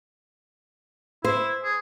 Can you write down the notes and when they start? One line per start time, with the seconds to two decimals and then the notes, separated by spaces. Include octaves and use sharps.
1.25 E4 C5
1.64 G#4